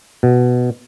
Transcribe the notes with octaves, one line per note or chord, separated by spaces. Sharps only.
B2